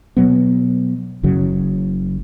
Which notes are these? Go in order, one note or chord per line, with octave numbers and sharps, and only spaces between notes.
B2 F#3 B3
F#1 F#2 C#3 F#3